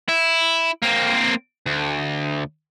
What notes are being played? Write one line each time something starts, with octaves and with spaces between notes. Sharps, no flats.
E4
A#3 C4
D2